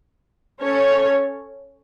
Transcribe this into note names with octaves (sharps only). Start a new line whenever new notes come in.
C#4 A4 C#5